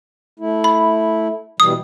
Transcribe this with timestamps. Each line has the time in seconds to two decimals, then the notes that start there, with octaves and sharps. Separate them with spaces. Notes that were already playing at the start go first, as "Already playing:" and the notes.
0.40 A3 E4
0.64 B5
1.60 B2 E3 G3 D#6